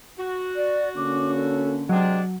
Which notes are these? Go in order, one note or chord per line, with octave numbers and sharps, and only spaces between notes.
F#4
D5
D3 A#3 C#4 D6
A4
C3 F#3 G#3 D4 G5